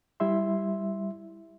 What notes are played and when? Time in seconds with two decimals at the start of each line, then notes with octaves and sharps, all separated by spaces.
0.20 G3 E4 E5 C6